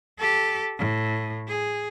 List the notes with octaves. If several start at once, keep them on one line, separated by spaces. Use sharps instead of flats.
G4 A4
A2
G#4